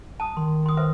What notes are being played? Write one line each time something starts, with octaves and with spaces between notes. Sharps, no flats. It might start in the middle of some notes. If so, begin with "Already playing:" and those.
A5 D#6
D#3 C6
C6 D#6
B4 C5 E5